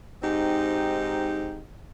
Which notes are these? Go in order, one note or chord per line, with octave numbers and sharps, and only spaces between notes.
G#2 C4 D#4 G4